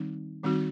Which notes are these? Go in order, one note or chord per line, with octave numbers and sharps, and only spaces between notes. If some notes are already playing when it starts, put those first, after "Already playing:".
Already playing: D#3 G3 C4 D#4
D#3 G3 C4 D#4 F#4